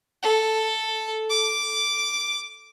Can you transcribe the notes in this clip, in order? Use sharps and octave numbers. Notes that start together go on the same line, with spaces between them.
A4
D6